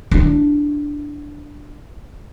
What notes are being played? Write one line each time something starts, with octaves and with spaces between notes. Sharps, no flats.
D4 E4